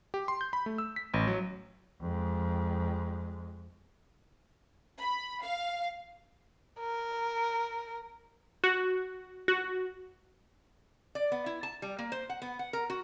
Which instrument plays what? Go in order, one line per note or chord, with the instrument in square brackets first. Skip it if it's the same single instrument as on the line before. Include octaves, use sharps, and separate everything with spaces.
[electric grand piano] G4
C6
G6
B5
A3
E6
B6
A1
F#3
[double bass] F2 G#3
[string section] B5
F5
[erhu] A#4
[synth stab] F#4
F#4
[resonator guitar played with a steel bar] D5
B3
E4
A5
G3
A#3
C5
F#5
B3
F#5
A#4
F#4